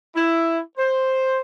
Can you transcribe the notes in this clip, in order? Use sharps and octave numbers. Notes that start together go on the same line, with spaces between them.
E4
C5